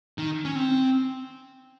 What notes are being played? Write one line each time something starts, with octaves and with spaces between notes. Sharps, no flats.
D#3
C#4
C4